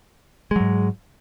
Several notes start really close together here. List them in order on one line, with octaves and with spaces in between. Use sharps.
G#3 F#3 G#2